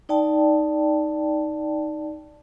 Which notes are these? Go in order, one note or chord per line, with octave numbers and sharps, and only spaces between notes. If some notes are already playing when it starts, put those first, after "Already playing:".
D#4 D5 G5 A5